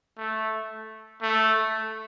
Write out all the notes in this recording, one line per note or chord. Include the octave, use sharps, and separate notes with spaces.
A3
A3